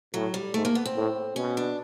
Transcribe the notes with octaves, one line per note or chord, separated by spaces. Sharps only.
A2 F#3
G3
G#2 A3
A#3
B3
C4
A2
B2 C#4
D4